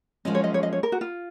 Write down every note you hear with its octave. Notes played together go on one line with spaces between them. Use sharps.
F#2 F3 G#3 C#4 D#5
C#5
D#5
C#5
D#5
C#5
A#4
F#4
F4